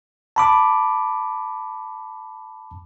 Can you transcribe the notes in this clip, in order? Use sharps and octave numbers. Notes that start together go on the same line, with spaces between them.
A5 B5 D6